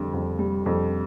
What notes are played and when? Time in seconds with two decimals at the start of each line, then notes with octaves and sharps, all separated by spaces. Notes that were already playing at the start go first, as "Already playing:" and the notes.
Already playing: F2 D3 G3
0.13 F2
0.39 G3
0.66 F2